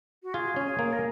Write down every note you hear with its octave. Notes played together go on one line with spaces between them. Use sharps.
F#4
F4 G#4
C#4
A#3
A#4